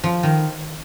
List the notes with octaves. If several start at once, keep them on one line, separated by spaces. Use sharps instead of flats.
F3
D#3